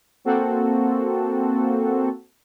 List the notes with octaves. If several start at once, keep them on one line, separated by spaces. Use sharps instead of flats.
A#3 C4 F#4 A4